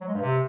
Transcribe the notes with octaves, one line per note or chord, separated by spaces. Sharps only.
F#3
G#3
G2
C3